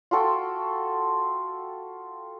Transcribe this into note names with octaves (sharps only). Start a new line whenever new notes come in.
F4 F#4 A4 G5